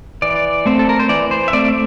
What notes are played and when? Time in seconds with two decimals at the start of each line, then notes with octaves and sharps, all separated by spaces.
0.22 E3 D5
0.66 A3 C4
0.79 A4
0.89 A#4
0.99 C5
1.09 E3 D5
1.31 C5
1.48 E5
1.53 A3 C4 D5